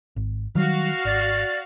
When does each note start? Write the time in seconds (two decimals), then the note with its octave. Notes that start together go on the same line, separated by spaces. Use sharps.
0.16 G#1
0.55 D#3 F#3 G3 F#4 F5
1.05 G#1 D5